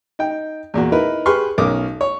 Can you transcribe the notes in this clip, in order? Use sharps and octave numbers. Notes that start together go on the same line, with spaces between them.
D#4 G5
E2 A#2 F#4
D#4 E4 A#4 B4
G4 G#4 B4 C6 C#6 F6
B1 C#4 A#4 D6 D#6
C#5